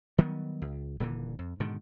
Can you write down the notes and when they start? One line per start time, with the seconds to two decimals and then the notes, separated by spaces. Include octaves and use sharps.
0.18 D#3 F#3 G3 B3
0.62 C#2
1.00 D#1 A#2 D3 E3
1.39 F2
1.60 G#2 B2 D3 D#3